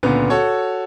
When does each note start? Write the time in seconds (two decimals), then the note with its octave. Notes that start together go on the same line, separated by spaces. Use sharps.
0.03 C#2 A#2 D3 B3
0.30 F#4 A4 C#5